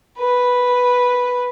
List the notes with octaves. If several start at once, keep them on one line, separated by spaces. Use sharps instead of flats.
B4